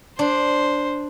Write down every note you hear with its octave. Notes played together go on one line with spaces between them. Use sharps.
D4 C5